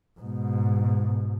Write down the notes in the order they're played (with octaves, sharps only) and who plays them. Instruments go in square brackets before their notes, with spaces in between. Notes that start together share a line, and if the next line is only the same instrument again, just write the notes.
[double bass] G#2 B2